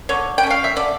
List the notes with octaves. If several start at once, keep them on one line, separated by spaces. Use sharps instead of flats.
D3 C#5
G5
A3 C#4
F5
E5
D3 D5